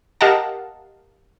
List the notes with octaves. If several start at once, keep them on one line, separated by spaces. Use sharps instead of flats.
G4 A#4 D#5 F5 F#5 A5